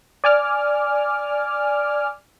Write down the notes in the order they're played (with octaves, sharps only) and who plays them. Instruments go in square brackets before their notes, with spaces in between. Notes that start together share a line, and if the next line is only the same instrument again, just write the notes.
[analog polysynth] D5 G#5 D6 F6